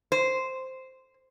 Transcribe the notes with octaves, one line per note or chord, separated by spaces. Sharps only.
C5